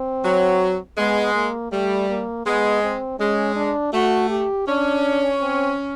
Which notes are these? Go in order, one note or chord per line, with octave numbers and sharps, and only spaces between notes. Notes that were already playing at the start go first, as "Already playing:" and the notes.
Already playing: C4
F#3
G#3 B3
A#3
G3 A3
A#3
G#3 B3
C4
G#3 C#4
D4
A3 F#4
G4
C#4 D4
C4